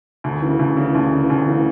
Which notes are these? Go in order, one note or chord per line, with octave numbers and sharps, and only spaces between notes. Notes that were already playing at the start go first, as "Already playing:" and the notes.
D2
C#3 E3
D2
C#3 E3
D2
C#3 E3
D2
C#3 E3